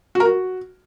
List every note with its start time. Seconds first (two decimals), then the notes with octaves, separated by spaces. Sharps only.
0.15 F#4
0.20 A#4
0.25 F#4